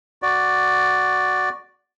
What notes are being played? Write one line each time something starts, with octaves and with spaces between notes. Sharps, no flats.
F#4 D5